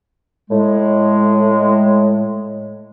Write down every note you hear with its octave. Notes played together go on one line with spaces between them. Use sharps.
A2 G#3